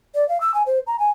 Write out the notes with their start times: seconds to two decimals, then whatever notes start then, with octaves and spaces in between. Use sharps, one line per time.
0.15 D5
0.29 F5
0.41 E6
0.54 G#5
0.66 C5
0.87 A#5
0.99 G#5